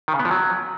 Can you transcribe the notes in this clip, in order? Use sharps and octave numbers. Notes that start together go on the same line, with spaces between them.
D#3
C#3
B3
F3
F#3